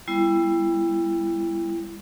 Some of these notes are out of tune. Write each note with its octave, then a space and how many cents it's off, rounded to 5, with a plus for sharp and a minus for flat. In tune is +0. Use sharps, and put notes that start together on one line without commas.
G3 +30 B3 +0 E4 +20